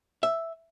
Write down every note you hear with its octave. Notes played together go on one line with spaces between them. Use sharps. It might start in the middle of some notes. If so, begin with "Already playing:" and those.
E5